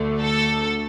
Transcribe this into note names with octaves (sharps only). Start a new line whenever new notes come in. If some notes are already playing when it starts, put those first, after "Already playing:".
Already playing: D2 D3 A3
A4